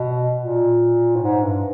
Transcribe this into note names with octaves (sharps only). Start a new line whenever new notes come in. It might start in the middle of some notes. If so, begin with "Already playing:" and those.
Already playing: B2
A#2
A2
G#2
G2